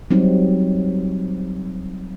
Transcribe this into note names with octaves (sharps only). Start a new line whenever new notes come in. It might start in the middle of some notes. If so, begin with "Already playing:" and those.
F#3 G3 C4 D#4